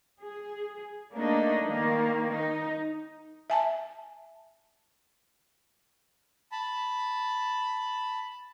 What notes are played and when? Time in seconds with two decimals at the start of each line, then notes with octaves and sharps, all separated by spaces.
0.19 G#4
1.15 A3 A#3 D4 D#4
1.68 D#3 A#3
2.34 D#4
3.50 E5 G#5 A5
6.52 A5 B5